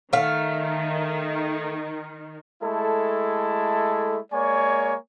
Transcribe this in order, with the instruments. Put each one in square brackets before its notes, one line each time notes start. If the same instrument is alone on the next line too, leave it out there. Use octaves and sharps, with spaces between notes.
[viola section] D#3 [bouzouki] A3 F5
[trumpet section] G#3 A3 E4 A4
G#3 A#3 C#5 D5 G#5 C#6